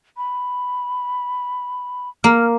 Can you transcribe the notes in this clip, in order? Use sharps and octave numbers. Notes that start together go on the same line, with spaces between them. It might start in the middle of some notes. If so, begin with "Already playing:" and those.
B5
A#3 F6